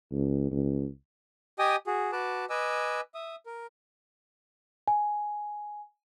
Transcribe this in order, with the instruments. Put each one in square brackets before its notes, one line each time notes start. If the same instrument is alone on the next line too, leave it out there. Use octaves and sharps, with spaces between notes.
[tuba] C#2
C#2
[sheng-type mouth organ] G4 D#5 G5 G#5 D#6
F#4 G#4
F#4 B4 A5 D6
B4 D#5 G#5 D6 E6
E5 D#6
A#4
[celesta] G#5